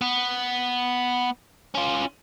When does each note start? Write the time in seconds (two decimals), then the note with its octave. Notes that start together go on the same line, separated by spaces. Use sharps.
0.01 B3
1.75 C#4 F4